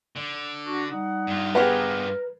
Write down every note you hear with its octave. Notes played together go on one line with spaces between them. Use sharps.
D3
D4 F#4
G3 D#4 F#5
G2 F4
B3 G4 G#4 A#4 B4